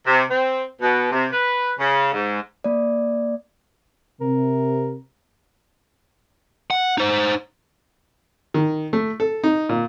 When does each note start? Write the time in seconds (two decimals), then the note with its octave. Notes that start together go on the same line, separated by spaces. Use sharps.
0.06 C3
0.31 C4
0.81 B2
1.11 C3
1.32 B4
1.78 C#3
2.13 G#2
2.64 A#3 D5
4.21 C3 A#4
6.71 F#5
6.98 D#4 C5
8.54 D#3
8.93 A3
9.20 A4
9.44 D#4
9.69 A#2